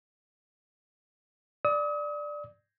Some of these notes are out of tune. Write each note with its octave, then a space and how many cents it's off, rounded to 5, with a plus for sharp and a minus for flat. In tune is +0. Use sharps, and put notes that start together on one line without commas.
D5 +5 D#6 +40